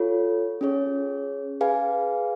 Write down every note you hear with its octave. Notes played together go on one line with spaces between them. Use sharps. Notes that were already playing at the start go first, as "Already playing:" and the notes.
Already playing: F4 A4 C#5
C#4 G#4 C#5
G#4 B4 F5 G#5